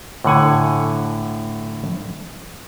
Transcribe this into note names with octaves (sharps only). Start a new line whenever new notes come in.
A2 D3 F#5 G#5